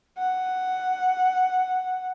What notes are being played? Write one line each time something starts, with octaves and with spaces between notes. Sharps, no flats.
F#5